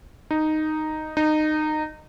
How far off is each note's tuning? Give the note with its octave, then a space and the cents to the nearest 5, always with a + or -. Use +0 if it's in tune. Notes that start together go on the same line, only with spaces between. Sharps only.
D#4 -5
D#4 -20